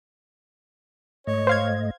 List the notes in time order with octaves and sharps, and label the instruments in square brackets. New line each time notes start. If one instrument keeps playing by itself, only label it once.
[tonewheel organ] G#2 A3 D#5 [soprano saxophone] C#5
[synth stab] C5 F5 G#6